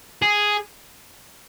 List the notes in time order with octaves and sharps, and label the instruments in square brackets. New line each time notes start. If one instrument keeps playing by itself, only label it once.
[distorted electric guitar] G#4